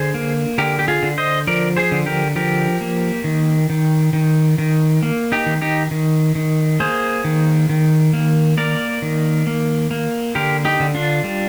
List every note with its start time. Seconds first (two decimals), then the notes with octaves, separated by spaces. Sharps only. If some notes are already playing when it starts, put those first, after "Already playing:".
Already playing: D3 G#4 C5
0.14 A#3
0.58 D3 G4 A#4
0.79 G4
0.88 F4 G#4
1.03 D3
1.18 C5 D#5
1.47 F3 A#4 D5
1.77 G#4 C5
1.92 D3
2.06 G4 A#4
2.36 F3 G4 A#4
2.81 A#3
3.24 D#3
3.70 D#3
4.13 D#3
4.58 D#3
5.03 A#3
5.32 D#4 G4
5.46 D#3
5.62 D#4 G4
5.91 D#3
6.35 D#3
6.80 A#3 G#4 C5
7.24 D#3
7.69 D#3
8.13 A#3
8.57 A#3 A#4 D5
9.02 D#3
9.47 A#3
9.91 A#3
10.35 D3 G4 A#4
10.65 D#4 G4
10.80 D3
10.95 D4 F4
11.24 G3